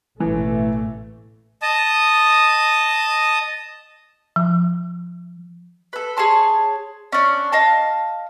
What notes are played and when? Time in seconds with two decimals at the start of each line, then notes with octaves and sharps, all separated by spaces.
0.20 A1 B2 E3 A3
1.62 D#5 A5 D#6
4.36 F3
5.93 A4 B4
6.17 G#4 C#5 A5 C6
7.12 C#4 D4
7.52 D#5 F5 A5